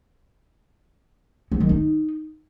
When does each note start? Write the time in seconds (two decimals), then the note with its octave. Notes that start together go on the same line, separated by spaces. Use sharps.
1.52 F#3
1.60 D#3
1.69 D#4